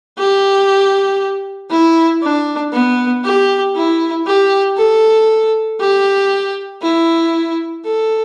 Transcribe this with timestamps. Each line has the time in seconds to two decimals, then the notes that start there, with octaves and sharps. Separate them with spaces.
0.18 G4
1.71 E4
2.22 D4
2.73 B3
3.24 G4
3.76 E4
4.26 G4
4.78 A4
5.80 G4
6.82 E4
7.85 A4